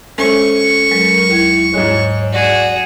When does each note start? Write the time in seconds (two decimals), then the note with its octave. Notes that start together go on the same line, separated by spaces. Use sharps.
0.18 G#3 A3 C#4 C5 G#5 C#6
0.91 F#3 G#3 A#4
1.31 D#2 E4 G#6
1.74 G#2 G#3 C#5
2.32 F#4 G#4 D5